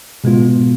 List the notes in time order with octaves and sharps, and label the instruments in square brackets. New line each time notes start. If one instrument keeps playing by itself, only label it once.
[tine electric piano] B2 G#3 B3 F4